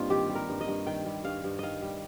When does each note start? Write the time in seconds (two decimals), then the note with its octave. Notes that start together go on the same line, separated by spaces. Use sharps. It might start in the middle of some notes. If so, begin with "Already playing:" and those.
Already playing: G2 G3 A#3 C4 D#4 F4
0.10 D#3 G4
0.30 G3
0.35 A#4
0.49 G2
0.61 D#5
0.68 G2
0.86 D#3 G5
1.06 G3
1.25 G2 F5
1.44 G2
1.59 D#3 D#5 F5
1.82 G3